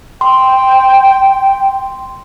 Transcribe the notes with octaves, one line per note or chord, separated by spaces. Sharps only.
G5 C6